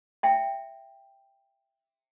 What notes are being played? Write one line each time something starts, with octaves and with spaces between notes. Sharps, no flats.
E5 G5